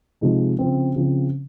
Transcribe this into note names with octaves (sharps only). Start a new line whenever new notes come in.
C3 F3 G#3 D#4
C#3 F3 C4
C#3 F3 C4